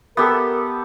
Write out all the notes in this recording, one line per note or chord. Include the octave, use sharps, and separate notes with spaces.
B3 G4 A4 A#4